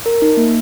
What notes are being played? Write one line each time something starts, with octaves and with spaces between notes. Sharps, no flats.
A#4
D#4
A#3